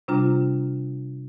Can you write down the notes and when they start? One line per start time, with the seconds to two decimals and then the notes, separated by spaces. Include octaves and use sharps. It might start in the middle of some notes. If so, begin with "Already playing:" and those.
0.08 C3 G3 D4 F4 A#5